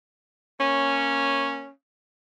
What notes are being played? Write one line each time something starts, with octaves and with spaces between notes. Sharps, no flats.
A#3 C#4